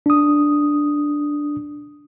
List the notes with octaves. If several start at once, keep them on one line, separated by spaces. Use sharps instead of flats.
D4 D#6